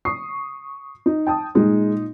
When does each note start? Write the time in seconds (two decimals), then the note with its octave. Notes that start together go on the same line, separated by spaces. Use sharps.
0.05 C#6 D#6 C7
1.06 D#4
1.27 G5 A5 D#6
1.55 A#2 G#3 D#4